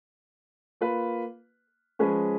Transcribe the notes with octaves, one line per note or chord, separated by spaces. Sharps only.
A#3 F4 B4
F3 G#3 C#4 G#4 B4